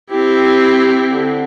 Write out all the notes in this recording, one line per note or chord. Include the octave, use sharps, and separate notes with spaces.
C4 E4 G4
D3